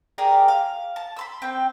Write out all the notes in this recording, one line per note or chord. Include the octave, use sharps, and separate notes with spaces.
G4 G#4 A#4 D5
F5
A5
B5 C6 E6
C4 G5